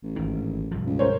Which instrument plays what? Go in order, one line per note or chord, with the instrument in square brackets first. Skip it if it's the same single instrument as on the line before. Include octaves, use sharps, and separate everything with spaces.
[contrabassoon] A1
[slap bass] G#1 D#3
B1 G2 F3
[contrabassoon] C#2
[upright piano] A#4 C5 C#5